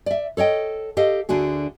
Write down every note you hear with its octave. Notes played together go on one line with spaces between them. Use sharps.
D5 E5
A4 C#5 D#5 G5
G4 A4 D#5 F5
D2 D3 D4 F#4 G#4